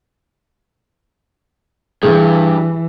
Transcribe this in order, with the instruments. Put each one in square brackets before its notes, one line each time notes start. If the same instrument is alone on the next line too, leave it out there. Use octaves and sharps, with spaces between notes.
[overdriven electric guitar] G2 [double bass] E3 [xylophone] G#4